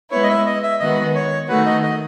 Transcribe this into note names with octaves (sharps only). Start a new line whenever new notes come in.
G#3 B3 E4 B4 C#5
D#5
E5
D#5
E5
D#3 G#3 B3 F#4 B4 D#5
C#5
D#3 A3 D#4 F#4 B4
D#5
D#5